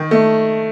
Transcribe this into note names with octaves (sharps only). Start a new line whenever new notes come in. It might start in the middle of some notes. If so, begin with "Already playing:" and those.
Already playing: D#3
A3